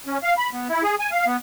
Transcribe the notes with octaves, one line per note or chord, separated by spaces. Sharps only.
C#4
F5
B5
B3
E4
G#4
G#5
F5
B3